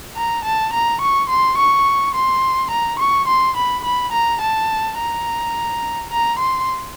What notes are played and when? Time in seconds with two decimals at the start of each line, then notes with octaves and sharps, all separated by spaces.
0.17 A#5
0.45 A5
0.73 A#5
1.01 C#6
1.30 C6
1.58 C#6
2.15 C6
2.71 A#5
3.00 C#6
3.28 C6
3.57 B5
3.85 B5
4.12 A#5
4.41 A5
4.97 A#5
6.11 A#5
6.39 C6